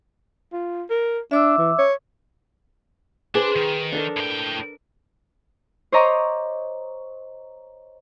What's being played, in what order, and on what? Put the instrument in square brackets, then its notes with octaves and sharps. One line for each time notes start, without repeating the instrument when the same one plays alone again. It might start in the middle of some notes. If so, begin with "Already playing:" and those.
[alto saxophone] F4
A#4
[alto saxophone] D4 [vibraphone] E5 D6 E6
[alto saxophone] E3
C#5
[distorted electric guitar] D4 [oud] G#4 [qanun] B4 C5 C6
[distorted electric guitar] D#3
[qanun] D4 A4 A#4
[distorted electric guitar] A2 G5
[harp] C5 C#5 D#5 A#5 C6 D6